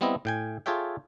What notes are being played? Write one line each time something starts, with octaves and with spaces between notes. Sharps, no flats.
G3 B3 C4 E4 D#5
A2 G5 G#5
F4 G#4 A4 C#5 E5 G5